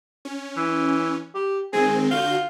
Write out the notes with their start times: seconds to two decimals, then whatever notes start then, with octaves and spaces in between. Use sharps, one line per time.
0.25 C#4
0.57 E3
1.34 G4
1.73 D#3 G#3 C4 G#4
2.11 D3 F4 F#4 G6